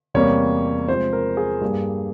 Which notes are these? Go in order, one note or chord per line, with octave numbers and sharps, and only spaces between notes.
E2 C3 G3 A#3 C#5
C3 F3 G#3 C5
A#4
G#4
G2 G3 A#3